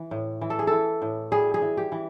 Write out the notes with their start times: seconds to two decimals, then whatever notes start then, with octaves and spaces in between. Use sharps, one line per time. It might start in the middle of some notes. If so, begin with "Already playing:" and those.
Already playing: E3
0.11 A2
0.41 E3
0.50 A4
0.59 G#4
0.67 E3 A4
1.02 A2
1.32 G3 G#4
1.54 G#4
1.62 E3
1.77 G4
1.92 E3